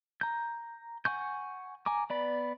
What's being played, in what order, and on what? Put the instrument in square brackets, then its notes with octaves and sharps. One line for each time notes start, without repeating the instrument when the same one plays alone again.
[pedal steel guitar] A#5 G6
F#5 G#5 C#6 G6
G#5 A#5 D6
B3 D5 B5